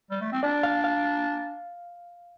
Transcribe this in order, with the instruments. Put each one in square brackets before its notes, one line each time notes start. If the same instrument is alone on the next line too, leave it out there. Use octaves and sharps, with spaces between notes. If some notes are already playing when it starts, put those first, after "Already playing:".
[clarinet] G3
A3
C4
[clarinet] D4 [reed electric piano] D5
[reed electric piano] F5
F5